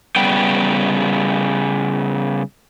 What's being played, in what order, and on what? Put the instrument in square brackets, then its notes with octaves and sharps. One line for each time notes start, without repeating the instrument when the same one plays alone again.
[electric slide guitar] C#3 G3 B3 G5